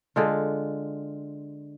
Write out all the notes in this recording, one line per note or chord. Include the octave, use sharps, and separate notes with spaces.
D3 G#3 F4